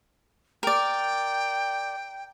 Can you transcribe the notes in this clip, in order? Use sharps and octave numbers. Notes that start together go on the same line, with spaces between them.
A#4 D5 G5